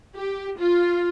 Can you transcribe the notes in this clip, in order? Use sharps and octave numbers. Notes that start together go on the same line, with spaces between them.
G4
F4